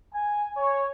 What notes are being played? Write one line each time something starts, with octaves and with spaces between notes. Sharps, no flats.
G#5
C#5